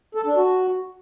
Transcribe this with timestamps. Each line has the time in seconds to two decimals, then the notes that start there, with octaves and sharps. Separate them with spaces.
0.15 A4
0.26 D4
0.36 F#4